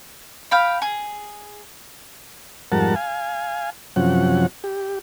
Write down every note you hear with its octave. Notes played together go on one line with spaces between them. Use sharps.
F5 G5 B5
G#4
F2 G#2 G3 A#4 F#5 A5
F5 G#5
F#2 C3 F3 C#4 F#5
G4